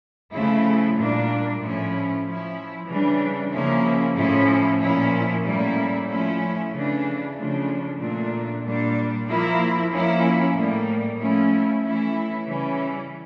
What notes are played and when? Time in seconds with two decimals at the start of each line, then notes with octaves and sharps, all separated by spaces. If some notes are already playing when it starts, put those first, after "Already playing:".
0.33 C#3 F3 A3 E4
0.96 A#2 G3 A#3 D4
1.60 A2 F3 A3 C#4 E4
2.24 F3 C#4 E4
2.87 C#3 E3 G3 D4
3.51 C#3 F3 A#3 C#4 E4
4.15 A2 F3 C#4 E4
4.79 A#2 F3 C#4 E4
5.43 A2 G3 A#3 C#4 E4
6.07 F3 A3 C#4 E4
6.71 C#3 E3 A3 D4
7.34 C#3 F3 A3 D4
7.98 A#2 A3 D4
8.62 A#2 G3 D4
9.26 F3 A#3 E4
9.90 F3 A#3 C#4 E4
10.53 A2 G3 A#3
11.18 F3 A3 C#4 E4
11.82 E3 A3 C#4 E4
12.46 C#3 E3 G3 C#4 E4